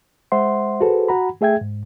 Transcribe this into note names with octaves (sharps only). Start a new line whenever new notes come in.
G#3 C5 E5 F#5 C6
F#4 G#4 A4 B4 C5
F#4 F#5 A#5 B5
A3 G#4 E5 G5 G#6
G#2